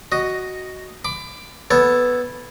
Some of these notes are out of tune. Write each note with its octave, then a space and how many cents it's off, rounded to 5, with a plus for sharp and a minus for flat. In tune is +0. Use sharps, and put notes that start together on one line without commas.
F#4 +5 D#5 +0
B5 +30 D6 +5
B3 +0 A4 +0 C#5 -20